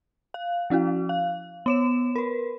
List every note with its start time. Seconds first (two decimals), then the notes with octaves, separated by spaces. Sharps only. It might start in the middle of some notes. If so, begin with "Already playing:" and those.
0.34 F5
0.70 F3 C#4 E4 F#4
1.09 F5
1.66 B3 C#5 E7
2.16 A#4 B4